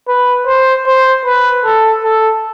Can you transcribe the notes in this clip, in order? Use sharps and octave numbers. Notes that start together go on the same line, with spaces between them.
B4
C5
C5
B4
A4
A4